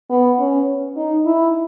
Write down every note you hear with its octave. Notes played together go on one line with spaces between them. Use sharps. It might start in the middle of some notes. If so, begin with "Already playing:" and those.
B3
C#4
D#4
E4